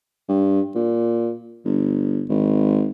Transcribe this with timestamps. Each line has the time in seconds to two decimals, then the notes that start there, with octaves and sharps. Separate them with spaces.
0.29 G2
0.76 A#2
1.65 G1
2.29 G#1